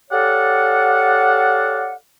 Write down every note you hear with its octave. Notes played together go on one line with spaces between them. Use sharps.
G4 A4 C#5 D5 F5 F#5